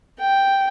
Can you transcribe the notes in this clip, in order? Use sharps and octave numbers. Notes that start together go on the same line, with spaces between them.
G5